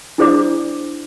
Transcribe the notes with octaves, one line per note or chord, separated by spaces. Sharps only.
D4 E4 G#4 C5 D5 D6